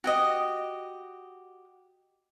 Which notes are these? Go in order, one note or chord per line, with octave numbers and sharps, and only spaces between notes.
F#4 G4 D#5